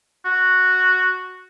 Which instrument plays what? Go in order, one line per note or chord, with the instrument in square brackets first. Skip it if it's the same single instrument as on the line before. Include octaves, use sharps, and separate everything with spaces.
[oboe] F#4